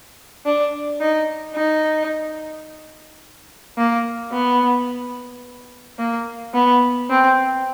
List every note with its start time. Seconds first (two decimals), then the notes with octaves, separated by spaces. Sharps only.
0.46 D4
1.01 D#4
1.56 D#4
3.77 A#3
4.32 B3
5.99 A#3
6.54 B3
7.10 C4